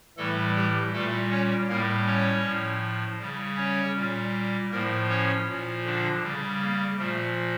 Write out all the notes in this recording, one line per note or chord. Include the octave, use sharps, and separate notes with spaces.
A2 E3 G3 A3 A4
G3 G4
A#2 G3 A3 A4
C#4 C#5
A2 G3 A#3 A#4
C#4 C#5
A2 F3
C#3 G3
C#4 C#5
A#2 G3
A2 F3 A#3 A#4
C#4 C#5
A#2 F3
D3 D4
C#3 G3
A#3
A#2 F3 A3